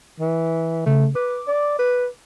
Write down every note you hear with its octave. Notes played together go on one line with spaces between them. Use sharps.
E3
C#3 A3
B4 D6
D5
B4